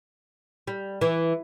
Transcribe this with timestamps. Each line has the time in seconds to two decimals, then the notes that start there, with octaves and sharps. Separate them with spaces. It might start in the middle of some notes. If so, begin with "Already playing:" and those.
0.67 G3
1.01 E3